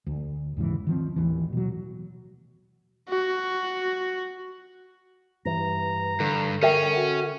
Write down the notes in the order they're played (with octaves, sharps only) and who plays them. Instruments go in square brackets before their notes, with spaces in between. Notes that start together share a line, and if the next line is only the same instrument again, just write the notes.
[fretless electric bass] D2
D#2 G#2 C#3 E3
D#3 F3 C4
A1 D#2 E3
B2 F#3
[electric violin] F#4
[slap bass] G2 E3 [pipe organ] A#5
[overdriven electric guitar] G2 [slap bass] D3
[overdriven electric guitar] C#4 [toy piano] A#4 E5 G5
[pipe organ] F#4